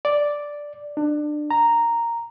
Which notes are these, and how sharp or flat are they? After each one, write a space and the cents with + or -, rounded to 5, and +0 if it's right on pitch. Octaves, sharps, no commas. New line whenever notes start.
D5 +0
D4 +25
A#5 -5